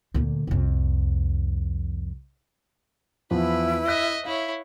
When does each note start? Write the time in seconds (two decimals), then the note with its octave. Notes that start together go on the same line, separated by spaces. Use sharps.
0.14 D2 A#2
0.47 C2 F2
3.31 E2 F3 B3 E4 B4
3.87 D#5 E5 F#6 B6
4.25 E4 C#5 F5